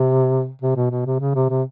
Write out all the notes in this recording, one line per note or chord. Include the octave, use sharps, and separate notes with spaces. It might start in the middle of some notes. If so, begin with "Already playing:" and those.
Already playing: C3
C3
B2
B2
C3
C#3
C3
C3